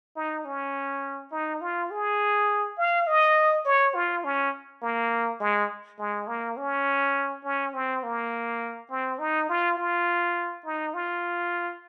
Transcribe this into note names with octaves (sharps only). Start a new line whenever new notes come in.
D#4
C#4
D#4
F4
G#4
F5
D#5
C#5
F4
C#4
A#3
G#3
G#3
A#3
C#4
C#4
C4
A#3
C4
D#4
F4
F4
D#4
F4